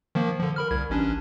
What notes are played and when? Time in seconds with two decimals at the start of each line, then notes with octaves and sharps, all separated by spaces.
0.15 D#3 F3 A#3
0.40 D3 F3
0.56 A#4 B5 F6
0.71 C2 G#6
0.90 A1 C#4 D4